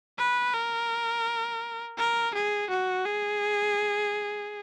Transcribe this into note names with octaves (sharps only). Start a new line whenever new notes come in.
B4
A#4
A#4
G#4
F#4
G#4